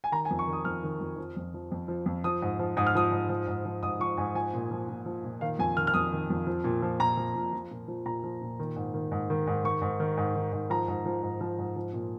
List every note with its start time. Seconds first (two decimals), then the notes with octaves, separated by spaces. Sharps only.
0.04 G#5
0.12 D#3 A#5
0.25 G#5
0.30 F2
0.39 C#6
0.47 D#3
0.53 D#6
0.65 F2 F6
0.83 D#3
1.01 F2
1.18 F3
1.36 F2
1.54 F3
1.71 F2
1.88 F3
2.06 F2
2.24 F3 D#6
2.42 G#2
2.59 F3
2.77 G#2 D#6
2.87 F6
2.95 F3 D#6
3.12 G#2
3.29 F3
3.47 G#2
3.65 F3
3.83 G#2 D#6
4.00 F3 C#6
4.18 G#2 G#5
4.35 F3 G#5
4.54 A#2
4.71 F3
4.88 A#2
5.06 F3
5.24 A#2
5.41 D#3 F5
5.59 F2 G#5
5.76 D#3 F6
5.87 F6
5.94 F2 D#6
6.12 D#3
6.30 F2
6.47 F3
6.64 A#2
6.82 F3
7.00 A#2 A#5
7.17 F3
7.35 A#2
7.53 F3
7.71 A#2
7.88 F3
8.05 A#2 A#5
8.24 F3
8.42 A#2
8.59 D#3
8.76 G#2
8.94 D#3
9.12 G#2
9.30 D#3
9.47 G#2
9.64 D#3 C#6
9.82 G#2
10.00 D#3
10.17 G#2
10.36 D#3
10.52 G#2
10.70 F3 A#5
10.88 G#2
11.06 F3
11.23 G#2
11.41 F3
11.59 G#2
11.76 F3
11.93 A#2